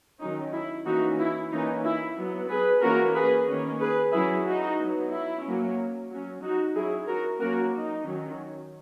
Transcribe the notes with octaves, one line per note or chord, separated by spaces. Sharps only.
D#3 F#3 C#4 D#4
E4
E3 A#3 C#4 D#4 F#4
E4
E3 A#3 C#4 D#4
E4
F#3 B3
G#4 B4
E3 A#3 C#4 F#4 A#4
G#4 B4
D#3 A#3 C#4
G#4 B4
F#3 C#4 E4 G#4
D#4 F#4
F#3 B3
E4
F#3 A#3 C#4
F#3 C#4
D#4 F#4
F#3 C#4 E4 G#4
F#4 A#4
F#3 A#3 C#4 F#4 A#4
D#4
D#3 F#3 C#4